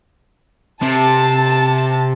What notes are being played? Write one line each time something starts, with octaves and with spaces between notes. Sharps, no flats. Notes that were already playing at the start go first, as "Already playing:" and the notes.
C3 A5